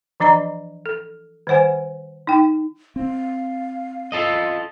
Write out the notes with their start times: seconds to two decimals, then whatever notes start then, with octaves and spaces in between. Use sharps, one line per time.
0.20 E3 F3 D4 D#5 A#5
0.86 A4
1.47 D#3 G3 C5 F#5 G#5
2.27 D#4 G5
2.96 C4 F5
4.12 F4 A4 D#5